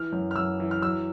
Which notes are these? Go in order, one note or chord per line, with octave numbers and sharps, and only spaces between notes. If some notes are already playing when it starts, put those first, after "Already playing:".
Already playing: E3 F6
F#2
F6
F#2 E6
E3
F6
F#3 E6